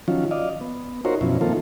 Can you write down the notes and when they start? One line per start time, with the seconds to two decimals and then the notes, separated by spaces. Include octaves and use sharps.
0.08 D#3 F3 F#3 C#4 F4
0.31 D5 D#5 F5
0.61 B3
1.05 D#4 F4 F#4 A#4 C5 C#5
1.21 F#2 B2 F3 C#4 E4
1.41 D#3 F3 A#3 C4 F4 A4